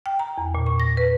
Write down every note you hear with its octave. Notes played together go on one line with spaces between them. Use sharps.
G5
A#5
E2
A#2
C#6
A#6
B4